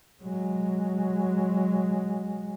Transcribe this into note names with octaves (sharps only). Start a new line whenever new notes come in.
F#3 G#3